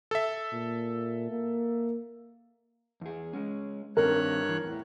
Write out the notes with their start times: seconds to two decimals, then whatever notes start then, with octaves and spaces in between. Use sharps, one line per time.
0.11 A4 E5
0.53 A#2
1.31 A#3
3.01 E2 G#4
3.33 G#3 C#4
3.97 G2 D#3 C4 A#4 C#5 F#6
4.49 E3
4.64 E2 A2